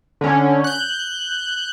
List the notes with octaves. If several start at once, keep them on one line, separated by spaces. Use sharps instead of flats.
D3 C#4
F#6 G6